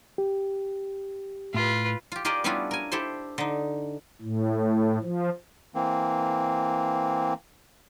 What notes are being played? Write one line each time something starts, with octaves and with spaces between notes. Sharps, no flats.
G4
A2 F4 B4
F4 G4
F4 G4 G#4 A#4 D5 D#5
G3 B3 C#4 D4 E4 F4
A#4 G#5
E4 G4 A4 C5 C6
D3 D#4
A2
F3
E3 A#3 C4